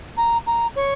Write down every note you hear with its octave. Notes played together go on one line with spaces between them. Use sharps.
A#5
A#5
C#5